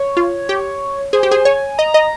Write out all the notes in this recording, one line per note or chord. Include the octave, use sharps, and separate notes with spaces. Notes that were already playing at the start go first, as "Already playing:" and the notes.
Already playing: C#5
F4
G4
G#4 C5
G4
G#4
C#5 G#5
D#5 A#5
D#5